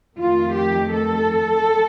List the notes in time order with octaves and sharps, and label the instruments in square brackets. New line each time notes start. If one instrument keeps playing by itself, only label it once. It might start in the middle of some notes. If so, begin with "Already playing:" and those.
[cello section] F2 D#3 A3 F4
G4
A4